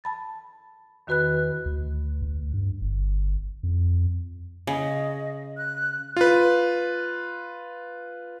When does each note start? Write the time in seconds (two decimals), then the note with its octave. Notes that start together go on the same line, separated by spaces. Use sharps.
0.04 A5 B5 A6
1.07 E2 D#3 F#4 B4 B5 F#6
1.66 D2
2.22 D2
2.54 G2
2.81 G1
3.63 F2
4.67 C#3 D#5
5.57 F#6
6.17 F4 B4